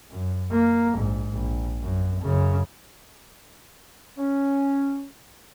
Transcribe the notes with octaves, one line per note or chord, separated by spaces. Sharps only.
F#2
A#3
A#1 G#2
A#1
F#2
F#2 C#3
C#4